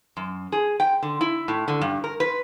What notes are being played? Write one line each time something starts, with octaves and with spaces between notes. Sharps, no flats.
F#2
G#4
G5
D3
E4
A2
D3
G2
A#4
B4